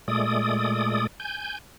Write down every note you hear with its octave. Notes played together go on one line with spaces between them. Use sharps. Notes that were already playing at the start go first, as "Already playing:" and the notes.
A#2 G#3 A3 D5 D#6
G#5 G6